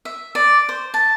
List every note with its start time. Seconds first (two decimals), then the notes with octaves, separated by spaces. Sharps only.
0.05 E5
0.35 D5
0.69 C5
0.94 A5